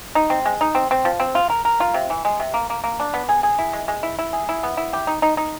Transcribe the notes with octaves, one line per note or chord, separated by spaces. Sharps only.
D#4
C4
G#3
D#4
C4
C4
F3
C4
F4
A#4
A#4
F4
C3
E3
G#3
C3
A#3
A#3
A#3
D4
B3
G#4
G#4
E4
G#3
G#3
E4
E4
G#4
E4
B3
E4
G4
D#4
D#4
D#4